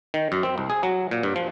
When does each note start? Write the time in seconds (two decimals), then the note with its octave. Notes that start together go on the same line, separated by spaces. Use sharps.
0.14 D#3
0.32 F#2
0.43 C4
0.58 C2
0.70 G#4
0.83 F#3
1.11 A#2
1.23 G2
1.36 F3